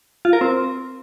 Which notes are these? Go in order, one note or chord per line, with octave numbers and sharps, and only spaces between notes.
F4
A#4
C4